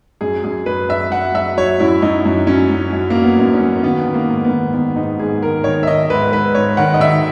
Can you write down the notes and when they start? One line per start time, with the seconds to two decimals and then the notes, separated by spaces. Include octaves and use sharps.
0.21 F#2 G#4
0.44 F#2 G#4
0.66 F#2 B4
0.89 F#2 E5
1.11 F#3 F#5
1.34 F#3 E5
1.57 F#3 C#5
1.80 F#2 E4
2.02 F#2 D#4
2.26 F#2
2.47 F#3 C#4
2.71 F#3
2.93 F#2
3.10 F#3 A#3
3.23 B3
3.39 F#2
3.54 C#4
3.61 F#3
3.77 C#4
3.84 D#3 B3
4.06 D#3
4.14 A#3
4.28 G#2
4.44 B3
4.51 D#3
4.74 D#3 B3
4.96 G#2 D#4
5.19 G#2 G#4
5.42 D#3 A#4
5.64 D#3 C#5
5.83 E5
5.87 D#3 D#5
6.10 G#2 B4
6.32 G#2 B4
6.55 G#2 C#5
6.77 D#3 F#5
6.94 D#5
7.00 D#3 E5